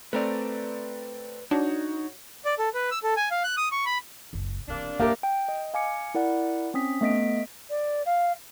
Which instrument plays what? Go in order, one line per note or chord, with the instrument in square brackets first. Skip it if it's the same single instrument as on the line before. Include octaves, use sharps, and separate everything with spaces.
[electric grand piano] A3 C4 D5 [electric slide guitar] B4 A#5
[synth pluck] D4 [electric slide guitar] D#4 [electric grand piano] F#4 C#5
[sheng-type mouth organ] D5
A4
B4
E6
A4
G#5
F5
F#6
D#6
C#6
B5
[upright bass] F#1 C#2
[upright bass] E1 E3 [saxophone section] C3 A#3 D4
[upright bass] F#2 A#2 [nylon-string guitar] A#3 [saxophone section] D4 G4 [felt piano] A#4 E5 F5
[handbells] G5
D#5
F5 G#5 D6 C#7
E4 A#4 D5 F#5
C4 C#4 D#6 B6
A3 B3 D#5 B6 D7
[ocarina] D5
F5